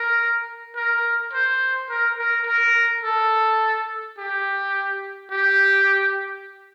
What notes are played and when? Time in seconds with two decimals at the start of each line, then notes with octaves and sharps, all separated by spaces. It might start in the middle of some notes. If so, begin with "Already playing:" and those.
Already playing: A#4
0.76 A#4
1.33 C5
1.90 A#4
2.18 A#4
2.47 A#4
3.04 A4
4.18 G4
5.31 G4